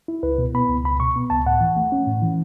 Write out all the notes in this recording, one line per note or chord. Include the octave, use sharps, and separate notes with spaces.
E4
C#2 B4
B2
B3 B5
C#2
C#2 B5
B2 C#6
B3
C#2 A5
A2 F#5
E3
A3
C#4
A2
E3